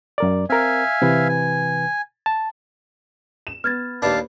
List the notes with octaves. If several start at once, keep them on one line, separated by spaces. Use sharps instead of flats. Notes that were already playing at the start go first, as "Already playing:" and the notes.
F#2 A#4 D5
C4 A#4 E5 F5 G#5
C3 E3 B4
G#5
A5
E7
B3 F6 G#6 A6
D#2 D4 B4 F5 A5